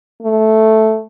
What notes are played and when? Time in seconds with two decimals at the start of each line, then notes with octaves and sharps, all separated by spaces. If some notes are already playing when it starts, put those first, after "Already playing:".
0.23 A3